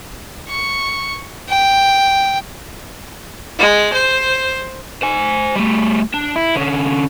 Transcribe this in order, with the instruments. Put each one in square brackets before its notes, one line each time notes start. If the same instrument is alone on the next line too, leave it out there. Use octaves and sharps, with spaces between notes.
[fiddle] C#6
G5
[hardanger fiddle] G#3
C5
[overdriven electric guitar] C5 G#5
G3 A3
D4
E4
D3 C#4